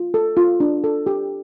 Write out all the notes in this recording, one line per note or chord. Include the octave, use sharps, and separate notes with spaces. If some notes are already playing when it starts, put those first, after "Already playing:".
Already playing: F4
A4
F4
D4
A4
G4